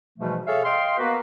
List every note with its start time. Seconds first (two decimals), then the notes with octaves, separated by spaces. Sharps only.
0.18 G#2 B2 E3 F3 G3 A3
0.47 G#4 A4 C#5 E5 F5
0.64 D#5 F5 G5 C6
0.98 A#3 B3 F#4 B4